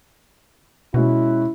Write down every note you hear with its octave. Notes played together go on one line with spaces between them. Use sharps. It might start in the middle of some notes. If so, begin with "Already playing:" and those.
B2 G#3 C#4 E4 F#4